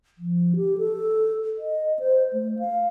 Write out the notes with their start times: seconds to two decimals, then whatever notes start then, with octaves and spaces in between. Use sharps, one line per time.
0.18 F3
0.56 G4
0.78 A4
1.58 D#5
1.99 C5
2.33 A3
2.59 F5